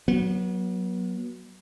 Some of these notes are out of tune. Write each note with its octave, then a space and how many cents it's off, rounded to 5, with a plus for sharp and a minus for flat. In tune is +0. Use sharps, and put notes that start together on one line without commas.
F#3 +0 B3 -40